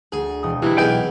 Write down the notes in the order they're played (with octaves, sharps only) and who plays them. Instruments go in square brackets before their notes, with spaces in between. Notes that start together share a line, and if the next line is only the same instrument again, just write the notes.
[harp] D2 [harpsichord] G#4
[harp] E1 D#6
[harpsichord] C3 [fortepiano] E3 E4
[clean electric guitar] B1 G5 [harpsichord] B3 D#4 G#4